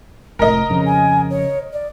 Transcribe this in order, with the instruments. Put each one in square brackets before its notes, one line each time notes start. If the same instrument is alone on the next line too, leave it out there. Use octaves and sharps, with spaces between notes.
[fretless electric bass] F1 A2 [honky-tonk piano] A#4 D#5 [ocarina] A#5
[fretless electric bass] F2 C#3
[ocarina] G#5
C#5
D5